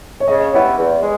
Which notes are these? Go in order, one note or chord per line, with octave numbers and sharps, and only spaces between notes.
C#5
C#3 D#5
G3 B3 E4 C#5
E2
G#3